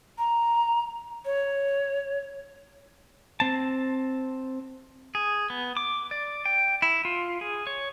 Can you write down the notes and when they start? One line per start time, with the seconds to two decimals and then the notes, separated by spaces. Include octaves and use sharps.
0.18 A#5
1.25 C#5
3.40 C4 A5
5.15 G#4
5.50 B3
5.77 D6
6.11 D5
6.45 G5
6.82 E4
7.05 F4
7.41 G#4
7.67 C#5